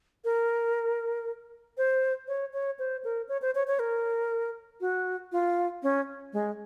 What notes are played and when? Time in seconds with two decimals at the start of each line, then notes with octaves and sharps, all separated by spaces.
0.25 A#4
1.78 C5
2.28 C#5
2.53 C#5
2.79 C5
3.04 A#4
3.29 C#5
3.42 C5
3.55 C#5
3.67 C#5
3.79 A#4
4.81 F#4
5.32 F4
5.83 C#4
6.33 G#3